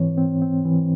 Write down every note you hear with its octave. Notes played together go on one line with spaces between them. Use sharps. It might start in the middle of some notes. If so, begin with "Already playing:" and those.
Already playing: G#2 E3 C4 C#5
C4
C4
E3